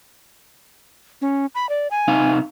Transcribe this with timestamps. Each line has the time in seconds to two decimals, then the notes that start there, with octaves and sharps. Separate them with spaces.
1.22 C#4
1.55 B5
1.69 D5
1.91 G#5
2.08 C3 D#4 F5